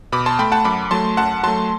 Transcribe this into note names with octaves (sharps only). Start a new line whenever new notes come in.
B2 B5 D6
A5 C6
A3 G5 B5
F#5 A5
F#2 B5 D6
F#3 A3 A5 C6
F#2 F#5 A5
F#3 A3 A5 C6